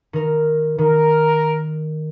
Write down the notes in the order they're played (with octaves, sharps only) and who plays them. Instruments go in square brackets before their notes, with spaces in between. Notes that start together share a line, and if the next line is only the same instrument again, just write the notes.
[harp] D#3 A#4
[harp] D#3 [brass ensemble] A#4